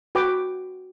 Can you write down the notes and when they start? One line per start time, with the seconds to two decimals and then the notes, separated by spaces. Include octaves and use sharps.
0.15 F#4 B4 G5 D6